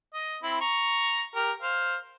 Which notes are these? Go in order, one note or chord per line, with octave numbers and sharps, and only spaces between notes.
D#5
C4 E4 B5
A#5 C#6
G4 A#4
C5 F5